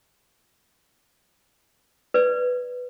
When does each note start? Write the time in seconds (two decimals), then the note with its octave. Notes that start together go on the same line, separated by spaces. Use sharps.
2.14 B4 D5